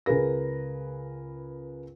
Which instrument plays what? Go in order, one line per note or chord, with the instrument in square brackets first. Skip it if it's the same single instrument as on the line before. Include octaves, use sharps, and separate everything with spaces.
[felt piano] C#2 G#4 A#4 B4 A#6